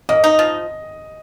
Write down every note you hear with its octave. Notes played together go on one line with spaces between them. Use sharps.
A#3 D#5
D#4
F3